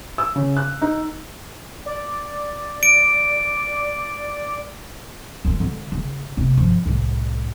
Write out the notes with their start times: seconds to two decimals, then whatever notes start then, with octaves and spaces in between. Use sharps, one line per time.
0.18 E6
0.36 C#3
0.57 F#6
0.82 D#4
1.86 D5
2.83 D7
5.45 F#2 F4
5.60 D3 G#3
5.92 C#3
6.37 C3 A#3
6.58 G2 F3
6.86 C2 A2